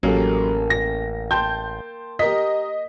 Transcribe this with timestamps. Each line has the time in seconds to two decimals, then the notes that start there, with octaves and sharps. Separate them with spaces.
0.03 A1 F#3 A#3 C#4 G4 A4
0.70 A#6
1.31 G5 A5 C6 G6
2.19 G4 A#4 D#5 B6